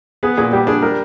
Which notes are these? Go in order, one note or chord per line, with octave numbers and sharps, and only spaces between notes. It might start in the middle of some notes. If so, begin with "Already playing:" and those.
B3 G#4
A#2 G#4
G3 G4
D4 G#4
G3 A#4